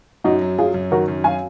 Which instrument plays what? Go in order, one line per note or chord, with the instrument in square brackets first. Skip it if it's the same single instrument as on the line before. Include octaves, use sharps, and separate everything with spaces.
[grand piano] F#2 [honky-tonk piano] D#4 F#4
[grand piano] F#3
[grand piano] F#3 [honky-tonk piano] F4 G#4
[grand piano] F#2
[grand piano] D#3 [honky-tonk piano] F#4 A#4
[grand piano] F#2
[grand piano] F#3 [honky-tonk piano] F5 G#5